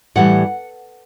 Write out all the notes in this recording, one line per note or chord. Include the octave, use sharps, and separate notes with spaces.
A2 E3 G3 F#5